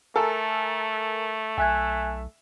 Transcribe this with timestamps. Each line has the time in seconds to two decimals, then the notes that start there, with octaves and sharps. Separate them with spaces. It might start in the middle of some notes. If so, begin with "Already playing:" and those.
0.16 A3 A4 A#4 G#5
1.58 B1 E5 G#5 F#6 G#6